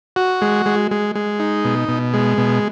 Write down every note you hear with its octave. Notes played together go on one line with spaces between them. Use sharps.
F#4
G#3
G#3
G#3
G#3
D#4
B2
B2
G#3
B2